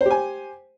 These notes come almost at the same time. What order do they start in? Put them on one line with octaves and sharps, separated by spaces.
C5 G4 G#5